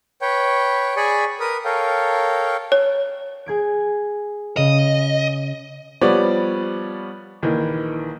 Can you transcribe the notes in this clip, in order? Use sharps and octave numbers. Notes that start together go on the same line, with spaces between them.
B4 C#5 G5
G#4 D5 G#5 B5 C#6
A#4 B4 D#6
A4 A#4 C#5 F5 G5
C#5
G#4 G#6 D7
C#3 D#5
F3 G3 B3 C#5 D5
A#1 D#3 E3